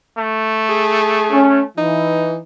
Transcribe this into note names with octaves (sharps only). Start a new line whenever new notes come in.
A3
G#4
C#4
E3 D#4